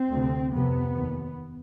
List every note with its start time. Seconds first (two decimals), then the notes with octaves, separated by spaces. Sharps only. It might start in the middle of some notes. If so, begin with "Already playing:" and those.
Already playing: C4
0.11 D2 C3
0.52 F2 C3 B3
0.94 D#2